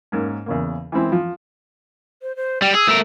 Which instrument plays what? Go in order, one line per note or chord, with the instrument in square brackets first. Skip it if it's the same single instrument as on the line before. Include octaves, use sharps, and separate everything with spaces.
[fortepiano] G#2 A#3 C#4
E2 C#3 A#3
E3 G#3 C4 E4
F3
[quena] C5
C5
[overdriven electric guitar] G3 [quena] G5
[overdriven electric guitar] G#4 [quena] E6
[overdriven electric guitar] A3 A#4